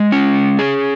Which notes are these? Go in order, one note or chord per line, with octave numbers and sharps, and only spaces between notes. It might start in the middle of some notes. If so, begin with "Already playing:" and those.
Already playing: G#3
C#4
G#4